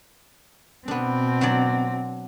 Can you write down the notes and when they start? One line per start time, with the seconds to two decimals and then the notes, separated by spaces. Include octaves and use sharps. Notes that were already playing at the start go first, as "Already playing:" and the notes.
0.88 B2 B3 C4 D4
1.41 F#3 D4 D5